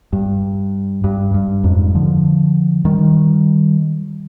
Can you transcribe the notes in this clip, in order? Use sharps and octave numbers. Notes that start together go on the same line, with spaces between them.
G2
G2
G2
F2 G#2
D3 F3
D#3 G3